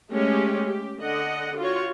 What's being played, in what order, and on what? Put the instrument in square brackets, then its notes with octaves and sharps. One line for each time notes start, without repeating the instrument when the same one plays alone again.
[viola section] G#3 A3 C#4 G4
G4
D3 D#5 F#5
F4 F#4 C#5